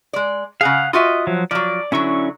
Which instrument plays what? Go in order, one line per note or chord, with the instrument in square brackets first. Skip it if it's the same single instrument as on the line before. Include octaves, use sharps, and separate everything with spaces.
[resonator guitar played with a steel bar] G#3 D5
[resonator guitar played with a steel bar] C#3 G#4 [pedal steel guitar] F5 F#5
[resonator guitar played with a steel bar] F4 F#4 E5 [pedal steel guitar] D#5
[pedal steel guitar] F3 F#3
[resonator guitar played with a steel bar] F3 F#3 [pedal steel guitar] D5
[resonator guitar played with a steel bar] D3 F#3 [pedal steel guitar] C#4 E4 C#6